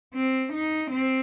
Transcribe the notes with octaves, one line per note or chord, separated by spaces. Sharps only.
C4
D#4
C4